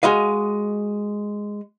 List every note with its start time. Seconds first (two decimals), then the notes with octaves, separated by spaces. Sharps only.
0.03 G#3 F#4 D#5 F5